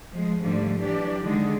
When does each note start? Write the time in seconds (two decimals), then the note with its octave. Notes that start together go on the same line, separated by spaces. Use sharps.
0.13 F3 G#3
0.42 G#2 D3 F3 G3 A3
0.81 E3 F#3 D4 G4 D5
1.22 D3 D#3 G#3 G#4